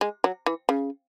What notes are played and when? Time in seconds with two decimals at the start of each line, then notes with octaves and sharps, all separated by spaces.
0.01 G#3
0.24 F#3
0.46 E3
0.69 C#3